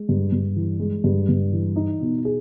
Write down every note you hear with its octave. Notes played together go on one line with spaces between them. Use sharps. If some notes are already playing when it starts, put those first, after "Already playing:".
Already playing: G#3
G2
G2
E3
G#3
G2
G2
E3
D#4
B2
G#4